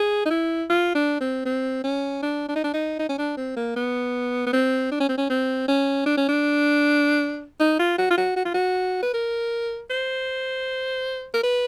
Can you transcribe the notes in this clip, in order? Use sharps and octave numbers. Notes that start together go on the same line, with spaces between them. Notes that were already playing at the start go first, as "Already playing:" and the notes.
Already playing: G#4
D#4
E4
F4
D4
C4
C4
C#4
D4
D4
D#4
D4
D#4
D#4
C#4
D4
C4
A#3
B3
B3
C4
D4
C#4
C4
C#4
C4
C#4
D4
C#4
D4
D#4
F4
F#4
F4
F#4
F#4
F4
F#4
B4
A#4
C5
A#4
B4